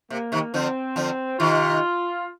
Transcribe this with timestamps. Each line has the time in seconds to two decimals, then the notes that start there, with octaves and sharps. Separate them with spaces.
0.10 C3 A#3
0.32 C3 D#3
0.53 D3 F3 C4
0.96 D3 F3
1.39 C3 D#3 F4